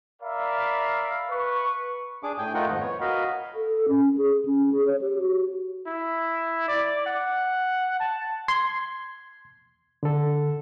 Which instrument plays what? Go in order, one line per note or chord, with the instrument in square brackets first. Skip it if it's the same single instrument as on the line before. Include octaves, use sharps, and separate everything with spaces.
[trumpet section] A#4 D5 E5 F5 B5
B4 C#6
[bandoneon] D4 G#4 D6
A2 G5 G#5
A3 D#4 F4 A#4 F#5 G5
F2 G#2 D#3
B3 C#5
F#4 A#4 D#5 F5 B5
[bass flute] A4
C#4
G#4
C#4
G#4
C#5
G4
F#4
[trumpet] E4
D5
F#5
A5
[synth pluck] C6 [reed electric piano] G#6
[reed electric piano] D3 A4